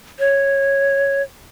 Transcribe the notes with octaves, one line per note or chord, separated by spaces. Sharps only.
C#5